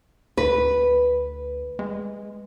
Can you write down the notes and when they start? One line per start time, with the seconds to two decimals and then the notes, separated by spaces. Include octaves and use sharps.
0.37 D2 B4
1.79 G#3